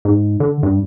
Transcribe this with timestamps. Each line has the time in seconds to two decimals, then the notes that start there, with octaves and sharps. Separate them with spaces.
0.05 G#2
0.40 D3
0.63 G2